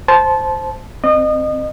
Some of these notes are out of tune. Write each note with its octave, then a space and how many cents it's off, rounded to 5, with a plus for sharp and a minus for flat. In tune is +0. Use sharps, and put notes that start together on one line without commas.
C5 +0 A5 -20
C4 +0 D#5 -30